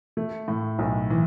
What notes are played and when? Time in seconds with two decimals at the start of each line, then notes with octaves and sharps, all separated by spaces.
0.17 A3
0.48 A2
0.79 B1
1.10 E3